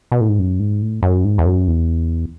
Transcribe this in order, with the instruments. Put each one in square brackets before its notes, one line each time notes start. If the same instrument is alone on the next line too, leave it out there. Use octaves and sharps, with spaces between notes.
[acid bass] B2
A2
G#2
F#2
G#2
A2
F#2
G#2
E2
F#2
E2